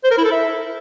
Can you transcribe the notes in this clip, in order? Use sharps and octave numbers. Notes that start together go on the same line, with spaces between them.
C5
A#4
E4
A4
E5